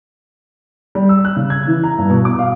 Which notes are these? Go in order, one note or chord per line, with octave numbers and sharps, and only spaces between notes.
G3
E6
F#6
C#3
G#6
E3
A#5
G2
B2
D6
F5